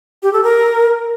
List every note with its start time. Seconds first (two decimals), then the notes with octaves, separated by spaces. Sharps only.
0.23 G4
0.33 A4
0.43 A#4